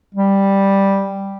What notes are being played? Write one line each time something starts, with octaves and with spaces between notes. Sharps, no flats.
G3